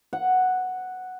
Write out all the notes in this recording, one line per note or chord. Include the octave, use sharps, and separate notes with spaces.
F#5